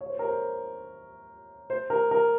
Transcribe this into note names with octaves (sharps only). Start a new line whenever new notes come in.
C#5
C5
A#4
C5
C5
A#4
A#4